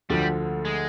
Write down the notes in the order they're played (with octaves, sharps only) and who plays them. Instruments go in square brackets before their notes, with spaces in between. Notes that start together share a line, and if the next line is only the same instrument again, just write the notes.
[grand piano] D2 D3 F3 [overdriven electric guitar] G3
[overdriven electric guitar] G#3